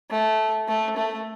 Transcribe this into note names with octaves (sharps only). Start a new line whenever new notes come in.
A3
A3
A3